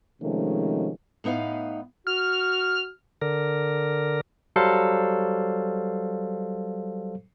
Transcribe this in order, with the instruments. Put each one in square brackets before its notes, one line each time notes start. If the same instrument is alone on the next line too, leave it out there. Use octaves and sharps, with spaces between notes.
[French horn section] C3 D#3 F3 G#3 A3 C#4
[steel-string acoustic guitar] A2 B3 D#4 B4 F5
[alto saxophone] F#4 [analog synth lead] F6
[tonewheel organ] D3 A#4
[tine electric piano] F#3 G3 A4 C5 F5